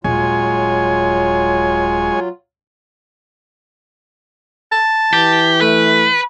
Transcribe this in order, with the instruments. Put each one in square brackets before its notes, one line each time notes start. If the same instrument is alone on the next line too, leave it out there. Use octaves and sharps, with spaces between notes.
[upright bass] D#1 [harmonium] F#3 F4 [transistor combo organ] G#3 C#5 G#5
[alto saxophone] A5
[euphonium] E3 [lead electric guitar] G4
[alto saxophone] A3 [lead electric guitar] B4